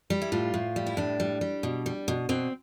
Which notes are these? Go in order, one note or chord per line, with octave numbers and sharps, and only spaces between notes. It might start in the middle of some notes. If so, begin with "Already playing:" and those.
G3
E4
A2 F4
A2
G3
E4
A2 D4
G3
G3
B2
G3
B2
B2 C4